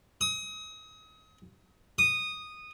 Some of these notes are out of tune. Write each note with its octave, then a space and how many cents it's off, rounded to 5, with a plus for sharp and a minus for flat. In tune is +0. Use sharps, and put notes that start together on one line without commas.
D#6 +35
D#6 -10